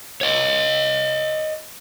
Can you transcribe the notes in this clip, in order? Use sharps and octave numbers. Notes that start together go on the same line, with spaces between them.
C#5 D#5